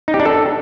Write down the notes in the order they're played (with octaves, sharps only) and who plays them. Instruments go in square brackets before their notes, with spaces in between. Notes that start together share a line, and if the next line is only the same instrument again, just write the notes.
[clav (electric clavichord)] D#4
G4
D4
A4